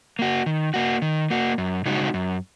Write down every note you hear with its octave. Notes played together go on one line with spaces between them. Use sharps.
A#3 F#4
D#3
A#3 F#4
D#3
A#3 F#4
F#2
C#3 G#3 D#4 F#4
F#2